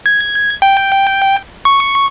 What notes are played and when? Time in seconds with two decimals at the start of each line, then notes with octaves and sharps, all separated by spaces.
0.06 G#6
0.62 G5
1.65 C#6